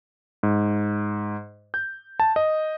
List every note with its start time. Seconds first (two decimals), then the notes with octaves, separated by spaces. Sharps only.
0.43 G#2
1.74 G6
2.20 A5
2.36 D#5